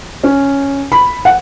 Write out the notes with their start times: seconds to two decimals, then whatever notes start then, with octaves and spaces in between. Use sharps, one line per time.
0.24 C#4
0.92 B5
1.25 F#5